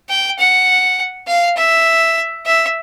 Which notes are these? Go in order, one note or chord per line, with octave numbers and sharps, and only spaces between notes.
G5
F#5
F5
E5
E5